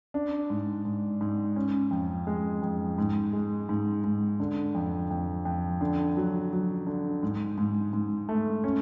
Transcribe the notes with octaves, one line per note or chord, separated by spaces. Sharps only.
D4
G#2
G#2
G#2
C#4
F2
G#3
F2
G#2
G#3
G#2
G#2
D3
F2
F2
F2
D3
F#3
F#3
D3
G#2
G#2
G#2
A3
C#4